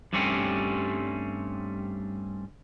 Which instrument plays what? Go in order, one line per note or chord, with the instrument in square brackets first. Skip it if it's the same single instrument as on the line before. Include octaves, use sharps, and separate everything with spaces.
[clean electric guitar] G2 G3 A3 C4 C#4